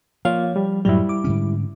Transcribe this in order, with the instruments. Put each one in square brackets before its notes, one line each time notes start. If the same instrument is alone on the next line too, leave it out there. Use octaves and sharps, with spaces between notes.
[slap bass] F3 [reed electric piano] A#3 F4 F5 [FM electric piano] C#5
[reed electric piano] G3
[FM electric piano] F#2 A2 F#3 [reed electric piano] G3 E4
[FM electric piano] D6
[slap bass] G#2 D3 C#4